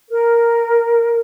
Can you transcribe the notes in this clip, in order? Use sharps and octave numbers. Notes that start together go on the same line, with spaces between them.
A#4